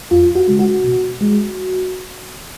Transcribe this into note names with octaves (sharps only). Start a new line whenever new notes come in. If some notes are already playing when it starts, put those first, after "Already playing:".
F2 F4
F#4
C#3 G#3
F#4
B2
G#3